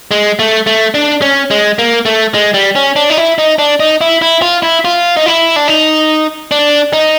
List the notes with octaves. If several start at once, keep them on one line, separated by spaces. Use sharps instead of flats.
G#3
A3
A3
D4
C#4
G#3
A#3
A3
G#3
G3
C#4
D4
D#4
E4
D#4
D4
D#4
E4
E4
F4
E4
F4
D#4
E4
D4
D#4
D4
D#4